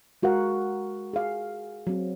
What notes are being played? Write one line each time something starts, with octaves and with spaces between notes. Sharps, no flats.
G#3 F#4 A#4 F5 F#5
G#4 F5
F#3 C4